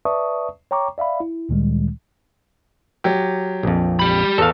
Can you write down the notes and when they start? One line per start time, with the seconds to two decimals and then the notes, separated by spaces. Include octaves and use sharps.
0.05 B4 D5 E5 A5 C#6 D#6
0.71 C#5 G5 A#5 C#6 D6
0.98 D5 E5 F5 B5
1.20 E4
1.49 D2 A#2 D#3 G3 G#3
3.04 F#3 G4
3.63 A#1 F2
4.00 G4 B5 F#7
4.38 E2 A4 F5 E6